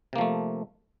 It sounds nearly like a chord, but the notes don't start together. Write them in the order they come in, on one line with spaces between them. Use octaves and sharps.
C3 A#3 F3 A3